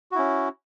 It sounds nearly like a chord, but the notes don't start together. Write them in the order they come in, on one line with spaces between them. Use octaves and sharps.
F#4 E4 C#4